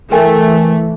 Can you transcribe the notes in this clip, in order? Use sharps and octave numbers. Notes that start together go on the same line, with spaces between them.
E3 A3 A#4 G5 G#5